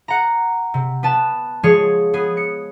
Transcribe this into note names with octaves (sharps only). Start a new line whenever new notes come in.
F#5 A#5
C3
B3 B4 A5
F3 G#3 G#4 C#5
B3 G#4
C#7